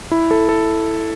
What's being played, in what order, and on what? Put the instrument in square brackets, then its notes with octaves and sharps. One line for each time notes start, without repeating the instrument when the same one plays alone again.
[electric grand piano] E4
A4
A4